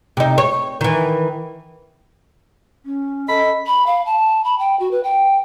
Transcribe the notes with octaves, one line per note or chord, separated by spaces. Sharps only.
C3 D#4
C#5
D#3 E3
C#4
A4 D#5 B5
B5
F5
A5
B5
G5
F#4
B4
G5